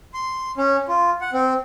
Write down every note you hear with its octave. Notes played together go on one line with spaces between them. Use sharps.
C6
C#4
F4
F#5
C4